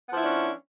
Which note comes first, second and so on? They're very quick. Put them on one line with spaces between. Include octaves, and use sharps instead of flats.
B3 F3 E4 D4 C#4